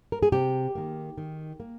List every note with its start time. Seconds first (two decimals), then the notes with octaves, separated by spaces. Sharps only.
0.12 A#4
0.23 G#4
0.32 C3 G4
0.75 D#3 A#3
1.18 D#3
1.60 A#3